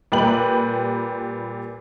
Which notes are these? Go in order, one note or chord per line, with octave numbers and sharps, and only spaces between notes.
A#2 G3 G4 B4 G5 F#7